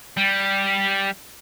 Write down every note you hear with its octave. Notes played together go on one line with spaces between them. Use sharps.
G3